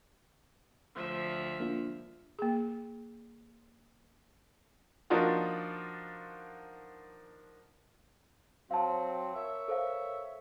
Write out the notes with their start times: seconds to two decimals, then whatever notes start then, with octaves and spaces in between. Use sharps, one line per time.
0.95 D2 F3 E5
1.60 A#3 D4 F4
2.39 A#3 G#4
5.10 F3 A#3 D4 D#4 F4 F#4
8.71 F#3 C4 F5 A5
9.36 A#4 C#5 E5
9.68 A4 C5 F5